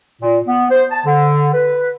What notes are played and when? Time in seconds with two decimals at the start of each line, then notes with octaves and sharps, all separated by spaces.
0.22 A#2
0.47 B3
0.70 C5
0.91 A5
1.06 D3
1.54 B4